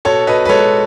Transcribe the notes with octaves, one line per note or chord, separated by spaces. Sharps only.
B2 A4 C#5
B2 B4 D#5
B4
G#3 A4 C#5